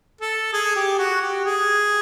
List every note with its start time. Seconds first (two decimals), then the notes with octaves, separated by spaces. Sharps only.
0.21 A4
0.53 G#4
0.76 G4
0.99 F#4
1.22 G4
1.45 G#4